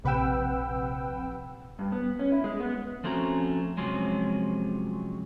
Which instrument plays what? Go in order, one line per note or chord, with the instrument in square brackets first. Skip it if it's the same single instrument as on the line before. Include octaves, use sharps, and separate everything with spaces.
[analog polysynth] A#1 C3 B4 F#5 G5 E6
[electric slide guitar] G2
B3
C#4
E4
G#3
B3
F3 A3 C4 C#4 F#4 A#5
C3 F3 F#3 G#3 C4 C#4